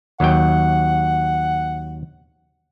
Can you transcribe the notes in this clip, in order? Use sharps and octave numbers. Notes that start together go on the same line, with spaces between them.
D#2 F#3 F#5 G5